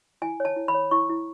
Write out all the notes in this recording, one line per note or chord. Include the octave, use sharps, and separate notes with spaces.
E4 G#5
C#5 A5
E4
B5
C#5
E4 C#6
E4